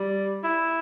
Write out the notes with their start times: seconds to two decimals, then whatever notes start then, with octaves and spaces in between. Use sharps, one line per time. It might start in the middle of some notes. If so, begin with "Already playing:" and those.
Already playing: G3
0.44 E4